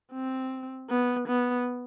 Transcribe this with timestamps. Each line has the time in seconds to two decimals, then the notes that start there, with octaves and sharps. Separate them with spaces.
0.13 C4
0.90 B3
1.28 B3